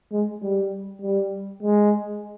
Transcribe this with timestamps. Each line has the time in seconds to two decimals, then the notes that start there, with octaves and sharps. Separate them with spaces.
0.12 G#3
0.43 G3
1.02 G3
1.63 G#3